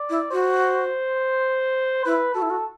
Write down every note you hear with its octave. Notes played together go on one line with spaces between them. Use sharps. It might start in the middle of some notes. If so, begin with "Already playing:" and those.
Already playing: D5
E4
F#4 C5
E4 B4
F#4 A4
E4
F#4